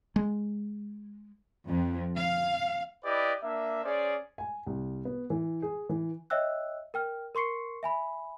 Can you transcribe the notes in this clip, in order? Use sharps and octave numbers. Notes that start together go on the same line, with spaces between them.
G#3
F2
F5
E4 G4 B4 D5 D#5
A#3 D4 E5
C#4 G#4 C5 D5
G#5
C2
B3
E3
G#4
E3
C#5 D#5 E5 G5 E6 F#6
A#4 G5 F6
A#4 C6 C#6 C7 C#7
E5 G#5 B5